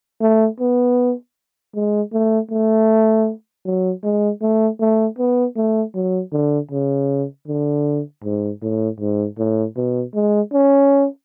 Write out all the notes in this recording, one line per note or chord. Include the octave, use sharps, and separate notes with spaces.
A3
B3
G#3
A3
A3
F#3
G#3
A3
A3
B3
A3
F#3
D3
C#3
D3
G#2
A2
G#2
A2
B2
G#3
C#4